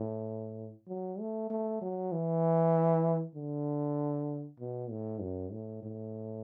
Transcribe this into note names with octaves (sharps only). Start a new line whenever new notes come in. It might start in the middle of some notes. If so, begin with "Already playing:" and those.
Already playing: A2
F#3
A3
A3
F#3
E3
D3
B2
A2
F#2
A2
A2